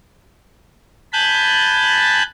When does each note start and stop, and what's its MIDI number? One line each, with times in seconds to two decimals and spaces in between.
1.13 2.23 80
1.13 2.23 81
1.13 2.23 83
1.13 2.23 90
1.13 2.23 91
1.13 2.23 93